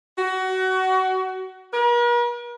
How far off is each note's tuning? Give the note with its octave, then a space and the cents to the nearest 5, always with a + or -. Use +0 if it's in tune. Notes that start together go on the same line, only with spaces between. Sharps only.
F#4 +25
A#4 +45